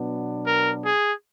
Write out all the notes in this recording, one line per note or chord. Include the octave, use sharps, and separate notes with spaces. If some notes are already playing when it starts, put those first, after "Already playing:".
Already playing: B2 F#3 B3 D4
A#4
G#4